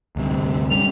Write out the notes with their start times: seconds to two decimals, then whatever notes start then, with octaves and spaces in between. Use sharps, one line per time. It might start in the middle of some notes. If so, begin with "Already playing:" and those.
0.16 D2 G2 C3
0.71 G3 C#4 F7